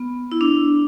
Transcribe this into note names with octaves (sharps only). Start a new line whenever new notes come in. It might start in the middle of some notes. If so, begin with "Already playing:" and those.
Already playing: B3
E4
D4